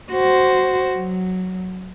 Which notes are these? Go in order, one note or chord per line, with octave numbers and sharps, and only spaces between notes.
F#4 C5
F#3